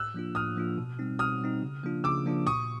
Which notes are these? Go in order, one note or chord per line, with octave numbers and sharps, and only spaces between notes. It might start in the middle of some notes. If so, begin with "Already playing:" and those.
Already playing: A2 E6 F#6
F3 A#3 D4 F4
A2 D#6 F6
F3 A#3 D4 F4
B2
G3 C4 D#4
B2 D#6 F6
G3 C4 D#4
C#3
F3 A#3 D4 F4
C#3 D6 E6
F3 A#3 D4 F4
A#2 C#6 D#6